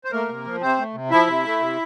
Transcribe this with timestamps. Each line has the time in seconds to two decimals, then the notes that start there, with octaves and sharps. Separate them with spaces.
0.04 C5
0.12 A3 A#3 A#4
0.29 C3
0.44 F3
0.61 C3 C4 C5
0.78 A3
0.94 C3
1.11 F3 E4 E5
1.27 C3
1.44 A3
1.60 C3